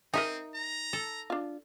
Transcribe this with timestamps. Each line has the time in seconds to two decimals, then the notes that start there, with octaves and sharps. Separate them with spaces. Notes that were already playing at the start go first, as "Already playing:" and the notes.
0.14 C4 D#4 A#4 D#5 E5 G#5
0.55 A#5
0.93 A4
1.30 D4 F4